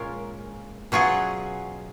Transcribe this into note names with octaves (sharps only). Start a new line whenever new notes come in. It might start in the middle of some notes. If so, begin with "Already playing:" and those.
Already playing: A#2 G#3 C#4 F4 A#4
B2 F#3 C#4 F4 G#4